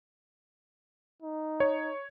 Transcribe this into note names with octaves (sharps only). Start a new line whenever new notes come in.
D#4
C#5